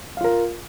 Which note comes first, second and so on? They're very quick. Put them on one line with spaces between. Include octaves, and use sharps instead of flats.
F5 F4 A#4